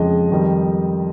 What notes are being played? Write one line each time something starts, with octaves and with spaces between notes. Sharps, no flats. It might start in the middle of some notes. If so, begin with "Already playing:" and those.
Already playing: F2 C#3 G#3 D#5
F2 D#3 G3